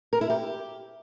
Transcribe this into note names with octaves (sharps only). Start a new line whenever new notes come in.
A#4
E4
G4